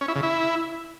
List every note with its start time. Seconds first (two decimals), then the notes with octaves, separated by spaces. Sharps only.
0.01 C#4
0.08 E4
0.16 C#3
0.23 E4